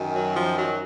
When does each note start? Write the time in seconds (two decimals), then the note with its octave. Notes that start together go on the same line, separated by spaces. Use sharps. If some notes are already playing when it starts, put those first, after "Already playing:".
Already playing: F#2 D#3
0.14 F#3
0.35 F3
0.57 F#3